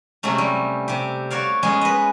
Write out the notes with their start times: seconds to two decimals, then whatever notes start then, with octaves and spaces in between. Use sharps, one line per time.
0.23 C3 F#3 G#3 A3 C#4
0.38 G3
0.88 C3 G4
1.30 F#4 C#5 D5 F5
1.63 G#3 B3 C#4 G#4
1.81 B4 D#5